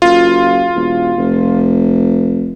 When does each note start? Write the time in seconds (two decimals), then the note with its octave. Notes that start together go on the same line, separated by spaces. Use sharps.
0.02 F#1 F4
0.75 E1
1.18 F1